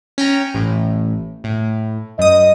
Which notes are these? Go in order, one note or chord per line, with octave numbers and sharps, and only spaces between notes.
C#4 G5 A#5
A1 A2
A2
F#2 D#5 D#6